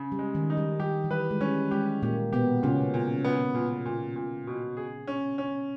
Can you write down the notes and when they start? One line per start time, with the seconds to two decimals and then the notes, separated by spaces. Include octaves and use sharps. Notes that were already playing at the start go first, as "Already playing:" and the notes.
Already playing: C#3
0.12 G3
0.19 G#3
0.35 D#3
0.50 D#4
0.57 G3
0.80 G3 G4
1.04 E3
1.11 G3 B4
1.31 G#3
1.41 G3 C#4
1.71 G#3 G4
2.02 A#2 A#3 G4
2.33 B2 B3 G4
2.63 A#2 C#3 C#4
2.94 A#2
3.25 B3
3.55 A#2
3.86 A#2
4.16 A#2
4.47 B2
4.77 G#4
5.07 C#4
5.38 C#4